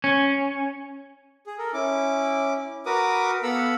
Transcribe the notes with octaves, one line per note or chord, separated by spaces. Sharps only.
C#4
G#4
A4 A#4
C#4 E4 D6
F#4 A#4 B4 D6 D#6
B3 A4 F5 F#5 B5 E6